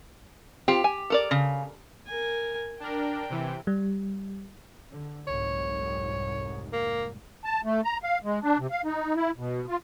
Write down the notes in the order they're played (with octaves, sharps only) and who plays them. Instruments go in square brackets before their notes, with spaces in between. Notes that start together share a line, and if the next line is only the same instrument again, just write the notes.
[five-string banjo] C4 F4 [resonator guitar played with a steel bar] G4
[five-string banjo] G#5
A4 A#4 D5
[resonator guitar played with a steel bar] C#3
[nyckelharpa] A#4 G#5
[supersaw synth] D4 A#4 [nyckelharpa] G5
[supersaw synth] C3 E3
[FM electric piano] G3
[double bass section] D3
[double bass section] F1 C2 G#2 [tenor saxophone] C#5
[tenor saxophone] A#3
[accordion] A5
A3
A#5
F5
G#3
D4
C3
F5
D#4
E4
B2
F4